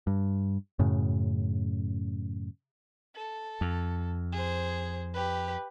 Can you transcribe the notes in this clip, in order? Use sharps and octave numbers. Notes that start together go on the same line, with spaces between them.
G2
F#2 A2 C#3
A4
F2
G#4 C5
G4 B4